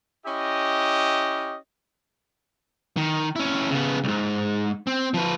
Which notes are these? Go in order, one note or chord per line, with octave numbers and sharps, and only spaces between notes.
C#4 E4 G4 D#5
D#3
C#4 E4
C#3 B3
C2 G#2
C4
F3 B4